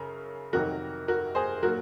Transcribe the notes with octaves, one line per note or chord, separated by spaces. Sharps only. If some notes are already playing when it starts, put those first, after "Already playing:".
Already playing: F#2 C#3 A#4
F2 C3 D#3 F#3 F#4 A#4
F#4 A#4
G#4 C5
A#2 F#3 F#4 A#4